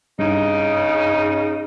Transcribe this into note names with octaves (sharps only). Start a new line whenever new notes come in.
G2 C#3 D#4